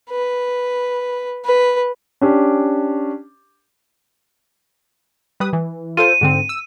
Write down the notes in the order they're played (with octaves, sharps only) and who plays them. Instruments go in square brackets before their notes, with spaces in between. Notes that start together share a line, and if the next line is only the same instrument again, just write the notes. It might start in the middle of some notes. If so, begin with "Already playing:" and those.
[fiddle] B4
B4
[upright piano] C#4 D4 G4
[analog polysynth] G3 B4 D#6
E3
[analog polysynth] F4 A4 C5 [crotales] D#7
[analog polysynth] G#2 D3 C4
E6